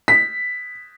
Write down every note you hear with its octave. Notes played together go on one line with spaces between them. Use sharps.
B6